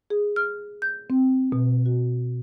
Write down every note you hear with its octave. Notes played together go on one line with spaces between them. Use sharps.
G#4
F6
G6
C4
B2
F#4